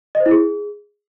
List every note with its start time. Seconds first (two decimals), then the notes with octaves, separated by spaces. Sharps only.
0.15 D#5
0.20 C5
0.26 E4
0.31 G#4